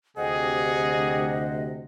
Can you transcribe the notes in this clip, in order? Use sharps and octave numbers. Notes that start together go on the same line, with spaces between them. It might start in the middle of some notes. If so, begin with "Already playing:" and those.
D2 C3 G4 G#4 C5 D#5 F#5